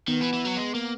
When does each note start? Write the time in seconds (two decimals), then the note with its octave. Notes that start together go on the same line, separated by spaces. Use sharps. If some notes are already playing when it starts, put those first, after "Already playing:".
0.08 D#3 B3
0.21 E3
0.33 E3
0.45 F#3
0.57 G#3
0.75 A#3